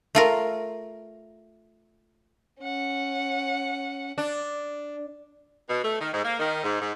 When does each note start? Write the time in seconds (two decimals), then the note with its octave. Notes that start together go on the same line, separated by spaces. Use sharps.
0.15 A3 F4 A#4
2.63 C#4 F#5
4.18 D4
5.68 B2
5.83 A3
6.00 D#3
6.12 G#2
6.24 A#3
6.39 D#3
6.63 G#2
6.80 G#2